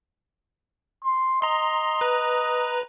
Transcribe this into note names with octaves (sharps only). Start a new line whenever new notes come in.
C6
D#5 A#5 C6
B4 A#5